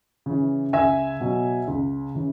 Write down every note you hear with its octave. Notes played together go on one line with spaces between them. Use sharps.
C#3 E3
C#2 E5 G#5
B2 F#3
C#2
C#3 E3